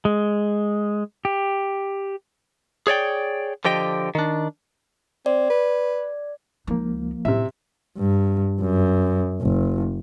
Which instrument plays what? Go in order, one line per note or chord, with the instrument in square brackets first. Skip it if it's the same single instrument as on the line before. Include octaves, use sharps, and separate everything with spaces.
[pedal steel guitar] G#3
G4
[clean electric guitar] G#4 C#5 D5 G5
D3 F3 G4 D#5 G5
D#3 D4
[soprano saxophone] C4 [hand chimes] D5
[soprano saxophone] B4
[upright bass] C#2 D#4 [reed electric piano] F3 A#3
[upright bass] A2 [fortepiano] C3 E5
[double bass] G2
F#2
F#1